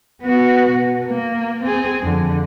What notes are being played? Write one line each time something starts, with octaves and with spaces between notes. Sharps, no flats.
B3 F#4
B2
A#3
C4 G#4
F2 D3